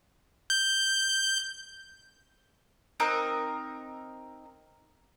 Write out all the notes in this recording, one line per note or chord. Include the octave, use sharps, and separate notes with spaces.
G6
C4 D#4 A#4 F#6